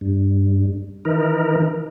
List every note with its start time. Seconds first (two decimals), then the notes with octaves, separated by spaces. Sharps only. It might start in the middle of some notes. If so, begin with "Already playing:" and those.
0.01 G2
1.05 D#3 E3 D#4 A#4